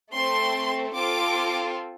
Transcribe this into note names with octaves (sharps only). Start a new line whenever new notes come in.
A3 C4 A4 C6
C4 F4 A4 D6